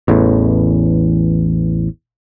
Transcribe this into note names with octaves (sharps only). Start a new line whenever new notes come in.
A1 E2 A2